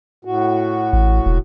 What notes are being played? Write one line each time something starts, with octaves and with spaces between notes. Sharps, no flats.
A2 F#4
A1
E1